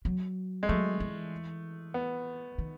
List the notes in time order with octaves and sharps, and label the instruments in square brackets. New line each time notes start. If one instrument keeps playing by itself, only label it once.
[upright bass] F#3
[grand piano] G#3
[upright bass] F#3 [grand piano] A3
[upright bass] E3
[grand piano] B3
[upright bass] D#3